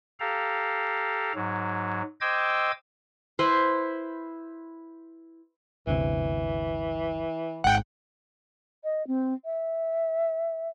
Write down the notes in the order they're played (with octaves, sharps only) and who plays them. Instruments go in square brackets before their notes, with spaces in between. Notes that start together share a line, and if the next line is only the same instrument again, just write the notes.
[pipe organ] G4 A4 F5 A#5
G#2 F#3
C5 D#5 G5 D6 E6 G#6
[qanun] E4 B4 C5
[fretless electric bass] G1 D2 C3 [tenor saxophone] E3
[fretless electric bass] G#1 G#2 [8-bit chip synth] F#5 G5
[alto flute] D#5
C4
E5